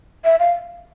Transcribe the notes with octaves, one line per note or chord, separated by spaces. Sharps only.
E5
F5